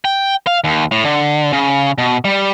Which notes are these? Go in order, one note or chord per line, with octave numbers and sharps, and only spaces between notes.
G5
F5
D#2
A2
D3
C#3
B2
G3